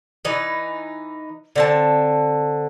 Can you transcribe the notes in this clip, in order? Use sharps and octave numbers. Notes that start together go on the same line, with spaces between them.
E3 D#4 B4
D3 C4 A5